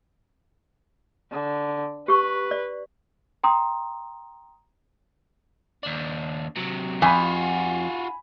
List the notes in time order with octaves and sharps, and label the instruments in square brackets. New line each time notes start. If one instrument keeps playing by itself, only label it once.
[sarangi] D3
[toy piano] G4 C#6 [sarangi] B4
[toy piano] D5
[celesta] G5 A#5 C6 D#6
[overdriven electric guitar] D#2 D4
C3 F#3
[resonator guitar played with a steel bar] F2 [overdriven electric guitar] F4 F#4 [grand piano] G#5 B5